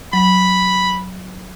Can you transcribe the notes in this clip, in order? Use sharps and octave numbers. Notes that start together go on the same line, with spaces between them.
F#3 B5